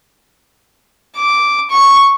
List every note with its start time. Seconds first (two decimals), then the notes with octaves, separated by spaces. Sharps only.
1.16 D6
1.71 C#6